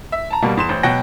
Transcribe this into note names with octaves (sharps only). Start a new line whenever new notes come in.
E5
A5 A#5
B2 G3 A#3
E2 C6 E7
A1 C5
B2 F#3 F#5 G5 A#6